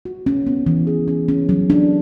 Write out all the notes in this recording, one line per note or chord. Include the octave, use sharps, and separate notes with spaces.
F#4
C#4
B3
E3
G#4
C#4
C#4
F#3
D4